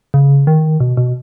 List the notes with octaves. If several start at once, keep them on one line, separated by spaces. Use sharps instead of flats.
C#3
D#3
B2
B2